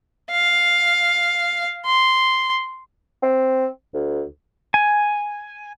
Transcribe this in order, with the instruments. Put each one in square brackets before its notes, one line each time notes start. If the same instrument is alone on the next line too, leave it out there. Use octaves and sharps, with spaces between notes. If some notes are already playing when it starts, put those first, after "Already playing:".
[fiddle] F5
C6
[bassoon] C4
D2
[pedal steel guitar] G#5